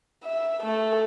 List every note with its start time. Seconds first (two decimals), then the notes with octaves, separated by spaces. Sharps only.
0.24 E5
0.61 A3 A4